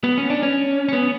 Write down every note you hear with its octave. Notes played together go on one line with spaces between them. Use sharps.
B3
C#4
D4
C#4
C#4
B3